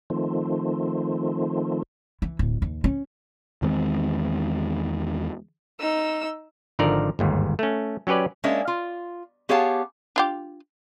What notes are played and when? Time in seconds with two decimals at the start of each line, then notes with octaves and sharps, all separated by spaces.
0.10 D#3 F3 A3 C4
2.22 E3
2.39 D1
2.62 D#2
2.84 C#4
3.62 E2 D#3 G#3 C4
5.80 D#4 E6
6.79 G#1 D3 F3 D#4 A#4 D5
7.19 G1 D#2 G#2
7.59 A3 C#4
8.07 F#3 C#4 G4 B4 D5
8.44 G#3 A#3 C#4 D4 E5
8.68 F4
9.49 B3 G4 G#4 C#5 F5 A5
10.16 D4 F4 G4